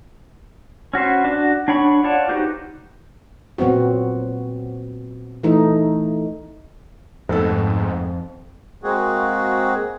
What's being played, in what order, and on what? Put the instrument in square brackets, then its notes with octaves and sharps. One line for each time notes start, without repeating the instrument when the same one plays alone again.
[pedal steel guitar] C#4 F#4 B4 C5
D4 F#4
D4 C#5 F#5 B5 C#6
F4 C#5 D5 F#5 A5
D#4 F#4 G4 B4 C5
[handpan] A#2 F#3 B3 C4 F#4
E3 A3 D#4
[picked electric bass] F2 [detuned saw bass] G#2 [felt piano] A3 B3 A4
[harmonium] G#3 A#3 C4 F#4 G#4